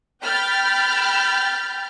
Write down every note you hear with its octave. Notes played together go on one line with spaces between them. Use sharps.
G5 B5 F6 G6 A6